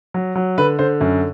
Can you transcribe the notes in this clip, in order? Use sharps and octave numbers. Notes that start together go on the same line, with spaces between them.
F#3
F#3
D3 B4
D3 C5
F#2